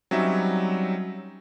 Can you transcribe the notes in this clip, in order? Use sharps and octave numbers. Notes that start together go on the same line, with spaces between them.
F#3 G3 C4 C#4 D#4 E5